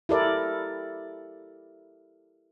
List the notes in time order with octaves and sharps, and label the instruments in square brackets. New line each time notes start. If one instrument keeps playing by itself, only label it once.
[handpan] E4 G4 A4 A#4 D5